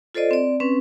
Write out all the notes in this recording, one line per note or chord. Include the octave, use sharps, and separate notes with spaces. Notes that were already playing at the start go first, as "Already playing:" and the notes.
F4 A4 C5 D5 D#5
C4 D5
C4 C#4 B4